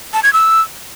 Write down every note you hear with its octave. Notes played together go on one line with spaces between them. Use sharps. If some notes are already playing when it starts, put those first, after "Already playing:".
A5
G#6
E6